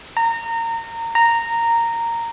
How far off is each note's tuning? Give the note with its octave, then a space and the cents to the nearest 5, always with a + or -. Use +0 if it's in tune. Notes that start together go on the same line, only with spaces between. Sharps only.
A#5 -25
A#5 -10